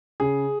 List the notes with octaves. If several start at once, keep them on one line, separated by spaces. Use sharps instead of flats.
C#3 G#4